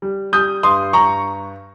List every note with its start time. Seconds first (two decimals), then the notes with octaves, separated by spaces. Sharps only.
0.02 G3
0.33 G3 D#6 G6
0.63 G2 C6 D#6
0.93 G2 A#5 C#6